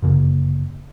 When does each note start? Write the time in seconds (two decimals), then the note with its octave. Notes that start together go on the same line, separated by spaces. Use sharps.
0.02 G1 F#2 C#3 A#3